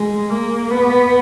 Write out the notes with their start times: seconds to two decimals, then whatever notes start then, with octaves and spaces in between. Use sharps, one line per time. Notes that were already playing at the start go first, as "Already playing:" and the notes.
Already playing: G#3
0.30 A#3
0.70 B3